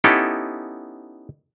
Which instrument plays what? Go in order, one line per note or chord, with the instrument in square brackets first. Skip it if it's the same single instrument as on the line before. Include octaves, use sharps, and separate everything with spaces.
[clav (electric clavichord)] B3 C#4 D#4 E4 G4 A4